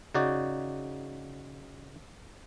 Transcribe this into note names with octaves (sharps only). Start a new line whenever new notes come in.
C#3 D#4 F#4 D5